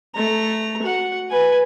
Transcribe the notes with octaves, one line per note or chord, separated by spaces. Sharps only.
A3 A#5
F#4 F#5
B4 G#5